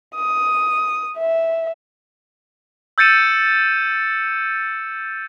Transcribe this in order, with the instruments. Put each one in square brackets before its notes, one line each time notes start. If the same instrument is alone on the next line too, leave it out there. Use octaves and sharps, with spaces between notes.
[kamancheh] D#6
E5
[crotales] E6 G6 A6 C#7 D#7 E7